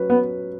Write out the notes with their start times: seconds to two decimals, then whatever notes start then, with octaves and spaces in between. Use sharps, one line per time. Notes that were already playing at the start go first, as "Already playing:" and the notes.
Already playing: F#3 C#4 B4
0.10 B3